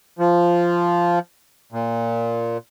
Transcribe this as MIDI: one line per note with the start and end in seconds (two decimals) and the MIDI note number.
0.19 1.19 53
1.72 2.58 46